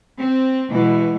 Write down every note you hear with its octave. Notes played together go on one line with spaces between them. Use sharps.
C4
B2 E3 G#3